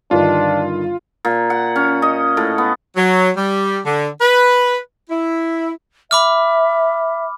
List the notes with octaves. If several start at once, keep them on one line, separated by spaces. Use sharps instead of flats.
G2 D3 D#3 D4 F4
A#2
F#5
C#4
D#5
A2
B3
F#3
G3
D3
B4
E4
E5 B5 D6 F6